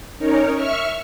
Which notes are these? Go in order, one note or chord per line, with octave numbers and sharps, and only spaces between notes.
C#4 D#4 A#4 C#5
E5 C#6 F6